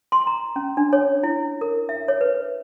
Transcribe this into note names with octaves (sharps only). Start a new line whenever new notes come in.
C6
A#5
C#4
D4
C#5
E4
A#4
E5
C#5
B4